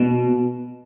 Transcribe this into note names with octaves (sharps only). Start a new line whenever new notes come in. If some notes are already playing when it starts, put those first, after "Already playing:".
Already playing: B2